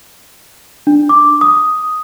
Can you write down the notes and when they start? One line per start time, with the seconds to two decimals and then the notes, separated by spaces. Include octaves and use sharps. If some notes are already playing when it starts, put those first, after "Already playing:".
0.87 D4
1.09 D6
1.41 D#6